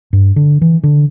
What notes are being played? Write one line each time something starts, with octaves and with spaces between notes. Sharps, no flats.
G2
D3
E3
D3